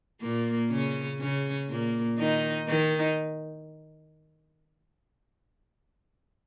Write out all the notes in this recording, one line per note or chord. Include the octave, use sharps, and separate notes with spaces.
A#2 A#3
C#3 C#4
C#3 C#4
A#2 A#3
D#3 D#4
D#3 D#4